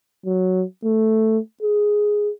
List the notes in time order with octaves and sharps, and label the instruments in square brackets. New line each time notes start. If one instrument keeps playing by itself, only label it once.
[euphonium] F#3
A3
G#4